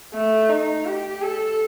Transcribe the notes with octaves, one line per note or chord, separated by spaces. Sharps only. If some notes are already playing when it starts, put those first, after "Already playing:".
A3
D#4
G4
A4